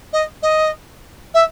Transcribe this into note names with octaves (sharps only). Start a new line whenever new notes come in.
D#5
D#5
E5